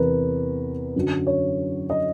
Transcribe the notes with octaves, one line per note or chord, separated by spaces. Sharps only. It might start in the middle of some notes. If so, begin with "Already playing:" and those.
Already playing: E2 C3 E3 A#4 B4
F#2 D3 F#3
C#5
D#5